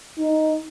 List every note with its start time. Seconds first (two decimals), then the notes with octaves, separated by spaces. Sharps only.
0.18 D#4